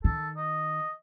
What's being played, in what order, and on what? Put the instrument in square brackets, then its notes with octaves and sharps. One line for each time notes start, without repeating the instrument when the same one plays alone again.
[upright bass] D#3 [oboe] A4
[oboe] D#5